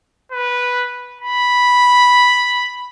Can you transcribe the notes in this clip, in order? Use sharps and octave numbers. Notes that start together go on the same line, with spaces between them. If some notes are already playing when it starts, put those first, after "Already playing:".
B4
B5